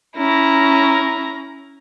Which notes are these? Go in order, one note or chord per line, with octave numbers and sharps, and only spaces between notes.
C#4 E4 A#5